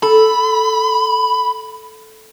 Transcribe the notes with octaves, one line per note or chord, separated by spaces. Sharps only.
A4 B5